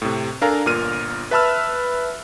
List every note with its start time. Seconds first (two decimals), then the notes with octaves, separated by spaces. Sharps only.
0.02 A2 C3
0.41 D4 A4 A#4 F5 G#5 A#5
0.66 G1 A#2 F4 A#4 F6 D#7
1.31 B4 E5 A5 B5 E6 F6